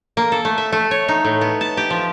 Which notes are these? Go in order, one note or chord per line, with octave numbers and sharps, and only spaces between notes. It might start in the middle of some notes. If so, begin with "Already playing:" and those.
A#3
A4
A3
E5
A3
C#5
D#4
A2
B3
A5
G4
F3